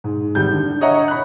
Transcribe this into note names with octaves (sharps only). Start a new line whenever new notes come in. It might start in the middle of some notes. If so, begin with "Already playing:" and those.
G#2
G#1 G3 G6
D3
C#5 D#5 E5 F#5 A#5
B5 F#6